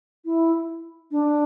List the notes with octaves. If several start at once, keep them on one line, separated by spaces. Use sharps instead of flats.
E4
D4